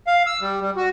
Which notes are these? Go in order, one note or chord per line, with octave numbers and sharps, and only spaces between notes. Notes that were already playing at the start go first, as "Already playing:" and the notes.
F5
E6
G3
G3
F#4